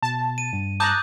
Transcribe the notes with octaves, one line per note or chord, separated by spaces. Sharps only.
B2 A5
D#7
G2
A5 A#5 D6 D#6 F#6 G6